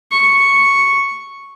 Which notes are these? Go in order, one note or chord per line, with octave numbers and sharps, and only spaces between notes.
C#6